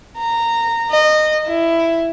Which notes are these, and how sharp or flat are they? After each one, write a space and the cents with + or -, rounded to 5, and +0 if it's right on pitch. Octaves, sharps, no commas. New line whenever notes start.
A#5 -15
D#5 -20
E4 +10